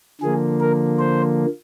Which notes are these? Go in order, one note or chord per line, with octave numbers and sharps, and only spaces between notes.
D3 F3 A#3 G#4
A#4
C5